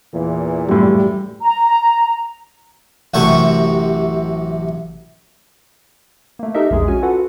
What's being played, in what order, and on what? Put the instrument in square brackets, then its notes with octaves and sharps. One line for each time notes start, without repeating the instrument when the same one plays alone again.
[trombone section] E2 A#2 E3
[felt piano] F#2 A2 [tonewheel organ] G3
[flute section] A#5
[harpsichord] A1 F#2 C3 A4 F#5 C#6
[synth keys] A3 A#3
D#4 G4 A4 A#4 D#5 E5
A#1 E2 G#3 G#4
C#4 F#4 G#5
F4 F#4 A4 B4 F#5